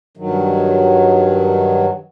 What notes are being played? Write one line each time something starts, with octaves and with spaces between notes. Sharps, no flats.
G2 D#3 F#3